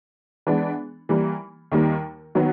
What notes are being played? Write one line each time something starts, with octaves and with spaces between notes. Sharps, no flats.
E3 G#3 B3 D4
E3 G3 A#3
D#2 D#3 G3 A#3
D#3 F#3 B3